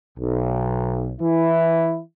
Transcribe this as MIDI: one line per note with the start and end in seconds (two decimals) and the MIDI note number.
0.18 1.11 35
1.21 2.00 52
1.21 2.00 64